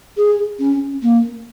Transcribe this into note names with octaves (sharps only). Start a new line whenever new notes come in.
G#4
C#4
A#3